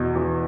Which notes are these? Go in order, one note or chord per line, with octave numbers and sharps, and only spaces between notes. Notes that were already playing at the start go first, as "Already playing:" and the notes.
Already playing: E2 B2
E2